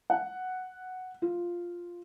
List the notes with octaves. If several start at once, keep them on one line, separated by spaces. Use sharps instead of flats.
F#5
F4